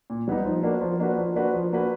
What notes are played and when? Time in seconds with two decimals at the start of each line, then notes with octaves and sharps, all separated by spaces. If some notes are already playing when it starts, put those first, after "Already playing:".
0.10 A#2
0.28 G3 B3 D#4
0.45 F3
0.63 A#3 D4 F#4 B4
0.81 F3
0.99 A#3 D4 F#4 B4
1.17 F3
1.35 A#3 D4 F#4 B4
1.53 F3
1.73 A#3 D4 F#4 B4